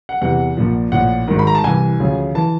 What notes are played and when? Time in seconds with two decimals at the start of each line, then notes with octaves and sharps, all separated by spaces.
0.09 F#5
0.21 E2 C3 E3 F#5
0.57 A#1 A#2 F3
0.92 A#1 A2 F3 F#5
1.28 G#1 G#2 D#3
1.39 B5
1.47 A#5
1.55 A5
1.64 C2 C3 E3 G#5
2.00 D2 C#3 F3
2.35 E3 A5